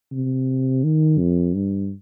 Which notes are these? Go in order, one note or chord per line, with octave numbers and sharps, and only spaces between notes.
C3
D#3
F2
G2